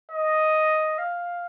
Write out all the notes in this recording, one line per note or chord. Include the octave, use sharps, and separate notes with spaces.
D#5
F5